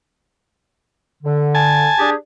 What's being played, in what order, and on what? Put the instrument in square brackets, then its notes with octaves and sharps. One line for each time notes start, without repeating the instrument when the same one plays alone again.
[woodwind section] D3
[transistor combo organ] G#5 A5
[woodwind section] D4 G4 G#4